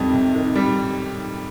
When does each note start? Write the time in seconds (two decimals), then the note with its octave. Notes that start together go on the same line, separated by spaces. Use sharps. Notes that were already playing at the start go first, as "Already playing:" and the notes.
Already playing: F2 C3 D#3 G3
0.13 C3
0.35 D#3
0.56 G3